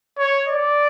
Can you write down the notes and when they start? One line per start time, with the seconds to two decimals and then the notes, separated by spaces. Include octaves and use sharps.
0.18 C#5
0.48 D5